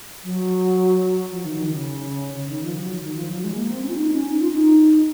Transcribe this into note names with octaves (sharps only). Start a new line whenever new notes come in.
F#3
F3
D#3
D#3
C#3
C#3
D#3
F3
F#3
D#3
F3
F#3
G#3
A#3
C4
C#4
F4
D#4
C#4
D#4
F4
D#4